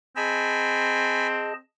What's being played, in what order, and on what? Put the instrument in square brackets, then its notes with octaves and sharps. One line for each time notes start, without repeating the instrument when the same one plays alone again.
[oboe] C4 [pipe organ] G#4 D#5 A5 [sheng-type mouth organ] G#5 B5